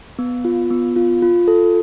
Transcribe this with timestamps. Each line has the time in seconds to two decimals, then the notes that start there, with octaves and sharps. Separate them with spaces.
0.19 B3
0.45 F4
0.70 B3
0.96 F4
1.22 F4
1.48 A4